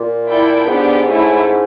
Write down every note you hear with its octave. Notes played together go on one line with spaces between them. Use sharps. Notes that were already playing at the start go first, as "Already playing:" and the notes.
Already playing: A#2
E4 A4 D5 G5
G#2 B3 D4 G4
A3 C#4 E4